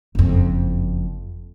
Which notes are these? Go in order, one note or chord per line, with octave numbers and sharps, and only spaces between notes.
F#1 F2